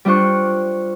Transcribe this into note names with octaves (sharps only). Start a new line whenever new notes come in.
G3 D4 F4 C5 C#6 F#6